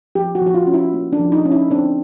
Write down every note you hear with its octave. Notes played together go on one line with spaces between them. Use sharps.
F3 G4
F#4
F3
F#4
F4
C#4
E4
A#3
D4
F3
D#4
C#4
E4
C4 D4